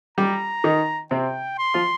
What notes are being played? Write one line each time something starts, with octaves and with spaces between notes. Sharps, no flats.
G3 G4 A#5
D#3 D#4
C3 C4 G5
C6
F3 F4